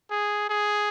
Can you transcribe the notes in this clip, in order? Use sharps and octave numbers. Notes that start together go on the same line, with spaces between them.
G#4
G#4